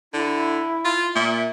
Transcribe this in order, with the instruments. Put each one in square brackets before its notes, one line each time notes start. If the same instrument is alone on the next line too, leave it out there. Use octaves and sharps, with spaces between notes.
[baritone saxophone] D3 [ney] E4
[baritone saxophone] F4
[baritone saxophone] A#2 [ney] E5